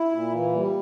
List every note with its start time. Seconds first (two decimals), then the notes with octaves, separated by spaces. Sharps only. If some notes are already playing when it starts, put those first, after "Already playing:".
Already playing: E4
0.12 A#2
0.33 E3
0.54 G3